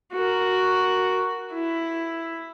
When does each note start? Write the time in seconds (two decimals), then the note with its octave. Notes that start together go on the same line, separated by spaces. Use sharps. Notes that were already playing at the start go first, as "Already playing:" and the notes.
0.13 F#4 A#4
1.52 E4